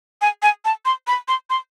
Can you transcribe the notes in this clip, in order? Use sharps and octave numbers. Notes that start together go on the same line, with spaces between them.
G#5
G#5
A5
C6
B5
C6
C6